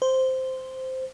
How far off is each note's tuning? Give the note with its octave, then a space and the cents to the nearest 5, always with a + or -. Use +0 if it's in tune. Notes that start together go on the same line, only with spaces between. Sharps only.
C5 -5